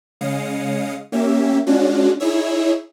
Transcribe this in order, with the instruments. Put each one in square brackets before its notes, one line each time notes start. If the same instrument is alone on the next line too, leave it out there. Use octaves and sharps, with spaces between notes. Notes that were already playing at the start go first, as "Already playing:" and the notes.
[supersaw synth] C#3 G#3 F5 D#6 C#7
A#3 C#4 G4 E5
G#3 C#4 D4 F4 F#4
D#4 E4 G#4 C#5 E5